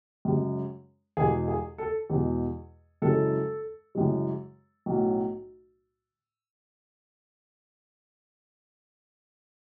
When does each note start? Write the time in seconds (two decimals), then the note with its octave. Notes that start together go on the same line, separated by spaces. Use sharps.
0.25 F#2 C#3 G#3
1.17 E2 B2 G#3 G#4
1.48 G#4
1.78 A4
2.10 E2 B2 G#3
3.02 F#2 C#3 E3 G#3 A4
3.95 F#2 C#3 E3 G#3
4.86 B1 A2 F#3